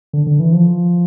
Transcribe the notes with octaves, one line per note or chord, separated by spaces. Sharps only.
D3
D3
E3
F3